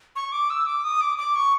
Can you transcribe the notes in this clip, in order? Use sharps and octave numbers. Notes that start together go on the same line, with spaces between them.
C#6
D6
E6
D6
D#6
D6
D6
C#6